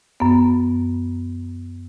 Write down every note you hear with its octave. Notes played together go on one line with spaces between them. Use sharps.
F#2 B3